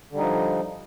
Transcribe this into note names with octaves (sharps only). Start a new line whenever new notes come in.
D3 F3 G3 D#4